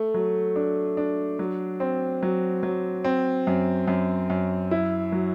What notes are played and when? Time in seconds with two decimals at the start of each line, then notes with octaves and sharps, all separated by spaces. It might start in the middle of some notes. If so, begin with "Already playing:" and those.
Already playing: A3
0.14 F#3
0.56 D4
0.97 D4
1.39 F#3
1.80 C4
2.23 F#3
2.63 F#3
3.04 C4
3.47 F#2
3.88 F#2
4.30 F#2
4.71 E4
5.12 F#3